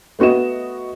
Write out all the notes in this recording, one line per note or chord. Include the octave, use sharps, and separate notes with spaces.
A3 B3 F#4 D#5 E7